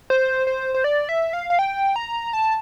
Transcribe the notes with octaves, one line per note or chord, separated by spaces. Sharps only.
C5
C5
C5
D5
E5
F5
F5
G5
A#5
A5